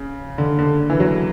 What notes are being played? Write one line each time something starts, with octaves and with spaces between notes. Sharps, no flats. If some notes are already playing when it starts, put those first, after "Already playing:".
Already playing: C#3
D3
D3
E3
F#3